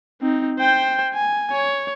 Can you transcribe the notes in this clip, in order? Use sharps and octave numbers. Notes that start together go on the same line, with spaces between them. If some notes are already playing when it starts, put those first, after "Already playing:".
C4 D#4
C5 G5
G#5
C#5